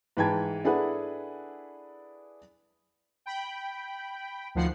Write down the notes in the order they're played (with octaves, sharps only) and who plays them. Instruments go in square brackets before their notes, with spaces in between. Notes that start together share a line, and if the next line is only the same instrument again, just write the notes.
[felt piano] G#2 E3 B4 G5 A5 G#6
D4 E4 G#4 A4 B4 F#5
[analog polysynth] G5 B5
D2 D#3 F3 F#5 C7